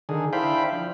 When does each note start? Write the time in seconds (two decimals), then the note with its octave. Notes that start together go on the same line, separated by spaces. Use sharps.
0.09 D3 D#3 G#4
0.33 D4 E4 C5 F5 G5 B5
0.73 F3